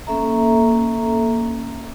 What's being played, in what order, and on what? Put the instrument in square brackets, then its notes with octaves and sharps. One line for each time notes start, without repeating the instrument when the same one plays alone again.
[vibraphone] A#3 C#4 A4 E5 A#5